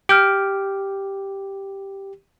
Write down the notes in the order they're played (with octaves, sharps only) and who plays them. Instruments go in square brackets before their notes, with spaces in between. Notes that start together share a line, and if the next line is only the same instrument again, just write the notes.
[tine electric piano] G4 [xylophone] F6 G6 D7